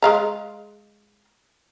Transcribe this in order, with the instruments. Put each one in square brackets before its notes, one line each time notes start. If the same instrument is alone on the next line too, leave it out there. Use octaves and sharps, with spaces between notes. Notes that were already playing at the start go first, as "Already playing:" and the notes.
[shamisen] G#3 F5 A#5